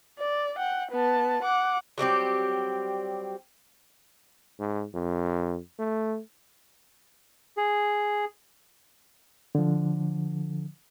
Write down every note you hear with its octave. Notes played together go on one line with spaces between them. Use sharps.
D5
F#5 G5
B3 A5
F#5 D6
F#3 G3 C4 G4
G#2
F2
A3
G#4
D3 F3